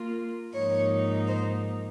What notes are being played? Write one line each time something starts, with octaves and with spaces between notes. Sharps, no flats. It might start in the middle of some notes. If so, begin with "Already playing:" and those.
Already playing: A#3 F4
G#2 F3 A#3 D#4 C#5
C5